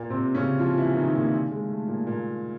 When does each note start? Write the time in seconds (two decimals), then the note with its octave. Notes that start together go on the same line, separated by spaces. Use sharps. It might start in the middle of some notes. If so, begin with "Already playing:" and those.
Already playing: A#2 A#3
0.10 C3 C4
0.35 C#3 C#4
0.59 F3 F4
0.77 E3 E4
0.96 D#3 D#4
1.14 A#2 A#3
1.51 G#3
1.69 A3
1.88 A#2 A#3
2.07 A#2 A#3